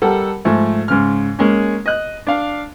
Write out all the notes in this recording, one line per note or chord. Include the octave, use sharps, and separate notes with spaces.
G3 A4 A#4 F#5
G#2 F3 A3
G#2 C#3 F6
G#3 A#3 C#4
D#5 F#6
D4 F5